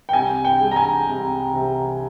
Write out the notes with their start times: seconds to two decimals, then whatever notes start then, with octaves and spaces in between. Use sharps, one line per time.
0.09 G5
0.13 C2 G#5
0.45 G5
0.60 G#3
0.71 A#5
0.76 G#5
1.07 C2
1.54 C3